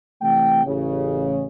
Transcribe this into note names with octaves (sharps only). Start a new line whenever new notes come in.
C3 E3 A3 G5
A1 C#3